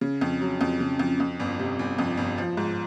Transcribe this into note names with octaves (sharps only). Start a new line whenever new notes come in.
C#3
F2
F#3
F2
C#3
F2
F2
G1
C3
G1
F2
G1
F3
G#2